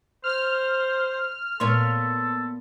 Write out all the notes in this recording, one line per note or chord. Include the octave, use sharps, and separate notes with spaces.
C5 F6
A#2 B3 A4 C#5 C6